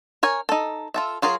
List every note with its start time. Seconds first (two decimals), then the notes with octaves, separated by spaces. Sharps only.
0.23 A#4 C#5 G#5
0.49 D#4 A4
0.94 F4 A4 E5
1.22 F#3 F4 G#4 A#4